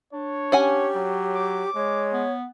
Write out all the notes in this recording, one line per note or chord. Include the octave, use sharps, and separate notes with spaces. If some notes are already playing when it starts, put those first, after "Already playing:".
D4 C#5
C#4 G4 F#5 G#5
F#3
D6
G#3 C#5
B3